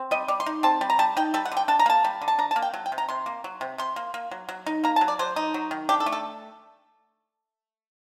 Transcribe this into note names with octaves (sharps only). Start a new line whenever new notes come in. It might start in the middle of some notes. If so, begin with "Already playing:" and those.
Already playing: C4
G3 D#5
G3 D5
C6
D#4
C4 A5
G3
A#5
G3 A5
D#4 G5
G3 A4
F#5
D3
G5
D4 A5
A#5
A#3 A5
G3
D3
A5
D4 A#5
A5
A#3
G5
F#3
G5
C3
A#5
C3 C6
A#3
F#3
C3
C3 C6
A#3
A#3
F#3
F#3
D#4
A#3 A#5
A5
F#3
D5
F#3 C5
D#4
F#3
D#3
D4 G4
A4
A3
A4